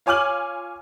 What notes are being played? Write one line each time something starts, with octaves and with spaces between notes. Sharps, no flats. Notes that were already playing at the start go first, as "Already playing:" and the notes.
F4 C#5 G#5 D6 F6 F#7